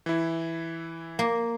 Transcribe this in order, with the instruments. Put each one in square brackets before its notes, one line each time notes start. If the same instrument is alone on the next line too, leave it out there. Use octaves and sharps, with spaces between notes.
[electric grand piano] E3 E4
[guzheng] A#3